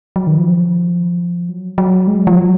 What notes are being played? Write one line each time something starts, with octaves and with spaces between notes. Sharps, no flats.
F#3
D#3
F3
F#3
F#3
G#3
F3
F#3